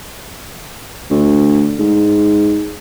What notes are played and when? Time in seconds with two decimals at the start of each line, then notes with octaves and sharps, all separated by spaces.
1.10 D2
1.79 G#2